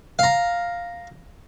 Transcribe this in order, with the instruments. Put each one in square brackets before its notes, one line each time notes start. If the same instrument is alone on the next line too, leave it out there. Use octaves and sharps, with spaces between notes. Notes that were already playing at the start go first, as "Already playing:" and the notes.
[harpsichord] F5 A#5